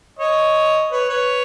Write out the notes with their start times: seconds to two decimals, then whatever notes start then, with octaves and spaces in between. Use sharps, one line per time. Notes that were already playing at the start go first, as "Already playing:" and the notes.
0.19 C#5 D#5
0.91 B4 C#5
1.09 B4 C#5